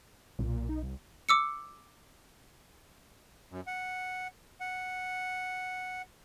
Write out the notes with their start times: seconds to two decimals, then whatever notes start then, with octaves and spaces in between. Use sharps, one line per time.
0.39 B1 A#2
0.69 D#4
0.82 C2
1.29 D6 E6 C#7
3.51 F#2
3.67 F#5
4.60 F#5